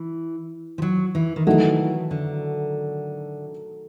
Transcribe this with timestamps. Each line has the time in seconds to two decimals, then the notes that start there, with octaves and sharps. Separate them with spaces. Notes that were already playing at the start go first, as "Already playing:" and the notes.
Already playing: E3
0.78 F3
0.82 F#3
1.15 E3
1.36 D#3
1.47 D#3 E3 F#3 A3
2.11 D3